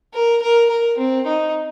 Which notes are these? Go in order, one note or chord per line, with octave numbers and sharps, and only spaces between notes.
A#4
A#4
A#4
C4
D#4